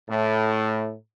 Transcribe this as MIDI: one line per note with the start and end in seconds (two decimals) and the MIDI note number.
0.10 0.95 45